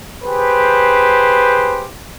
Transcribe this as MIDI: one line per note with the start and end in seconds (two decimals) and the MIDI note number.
0.24 1.88 67
0.24 1.88 68
0.24 1.88 71
0.24 1.88 72